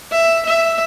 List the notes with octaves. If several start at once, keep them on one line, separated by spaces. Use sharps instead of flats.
E5
E5